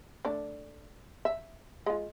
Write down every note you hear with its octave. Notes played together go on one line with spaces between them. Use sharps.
A3 D4 D5
E5
G#3 F4